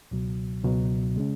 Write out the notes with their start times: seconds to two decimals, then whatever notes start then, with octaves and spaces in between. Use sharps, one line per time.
0.11 C#2 B2 F#3
0.64 C#2 B2 F#3
1.16 C#3 G#3 C#4